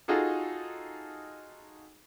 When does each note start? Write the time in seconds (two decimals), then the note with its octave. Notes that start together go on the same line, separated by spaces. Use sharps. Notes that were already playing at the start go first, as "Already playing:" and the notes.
0.08 D#4 F4 F#4 G#4 A4